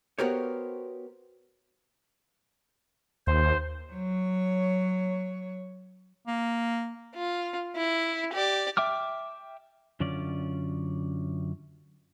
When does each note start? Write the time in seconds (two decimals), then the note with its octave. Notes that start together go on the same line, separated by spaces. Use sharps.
0.19 B3 F#4 G4 A#4 C5 C#5
3.27 D#2 C5
3.92 F#3 C#5
6.27 A#3
7.15 F4
7.76 E4
8.33 G4 D5
8.77 E5 G5 D6 F6
10.00 F#2 D3 C#4 F4 D5